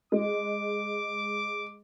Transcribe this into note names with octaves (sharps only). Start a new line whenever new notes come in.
G#3 D6